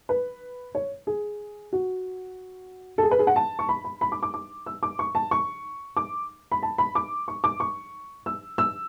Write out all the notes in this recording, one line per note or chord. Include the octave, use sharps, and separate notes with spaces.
B4
C#5
G#4
F#4
A4
G#4
B4
G#4
F#5
A5
C#6
B5
B5
B5
D6
D6
D6
E6
D6
C#6
A5
C#6
D6
B5
A5
B5
D6
C#6
D6
C#6
E6
E6